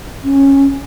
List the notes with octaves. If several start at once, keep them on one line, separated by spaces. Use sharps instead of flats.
C#4